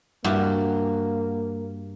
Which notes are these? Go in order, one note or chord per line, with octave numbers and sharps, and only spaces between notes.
G2 A#3 F#4 G4